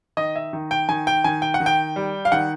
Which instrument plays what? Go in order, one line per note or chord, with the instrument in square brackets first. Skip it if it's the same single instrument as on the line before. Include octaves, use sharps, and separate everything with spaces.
[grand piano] D#3 D#5
E5
D#3
G5
D#3 G#5
G5
D#3 G#5
G5
F#5
D#3
G5
G3
F5
D#3 F#5